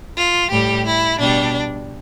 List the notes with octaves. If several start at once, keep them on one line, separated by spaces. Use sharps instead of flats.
F4
A2 G3 G4
E4
B2 G3 D4